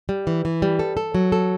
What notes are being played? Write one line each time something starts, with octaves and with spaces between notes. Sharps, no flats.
G3
E3
E3
G3
A4
A4
F#3
A4